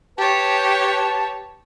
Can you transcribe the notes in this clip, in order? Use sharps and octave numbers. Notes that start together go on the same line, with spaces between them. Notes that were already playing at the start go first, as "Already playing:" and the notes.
G4 B4 C#5 A5